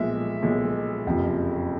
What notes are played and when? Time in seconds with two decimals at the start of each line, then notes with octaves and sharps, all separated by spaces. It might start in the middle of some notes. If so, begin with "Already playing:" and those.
Already playing: B1 A#2 F3 G#3 E5
0.42 B1 A#2 F3 G#3
1.06 F#1 F2 C3 F3